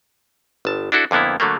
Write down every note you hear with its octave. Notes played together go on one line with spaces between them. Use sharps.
G1 A5
D4 E4 F#4 A4
F2 D3 A#3 B3 E4
D3 F#3 A3 A#3